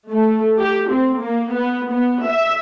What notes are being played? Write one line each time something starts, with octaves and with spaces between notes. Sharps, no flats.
A3
G4
C4
A#3
B3
B3
E5